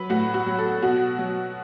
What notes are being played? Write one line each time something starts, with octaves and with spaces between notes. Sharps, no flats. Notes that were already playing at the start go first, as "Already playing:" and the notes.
Already playing: F#3 B4
A2 F#4
F#4
F#3
A4
B2 F#4
F#3